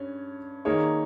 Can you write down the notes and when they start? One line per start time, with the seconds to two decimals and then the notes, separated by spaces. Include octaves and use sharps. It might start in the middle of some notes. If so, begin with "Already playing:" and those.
Already playing: G2 C#4
0.65 D#3 A#3 D#4 G#4 C#5